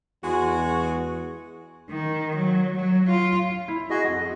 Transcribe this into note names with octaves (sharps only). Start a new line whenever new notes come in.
E2 G#3 F#4
D#3
F#3
F#3
F4
E4
F#4 G#4 D#5
F2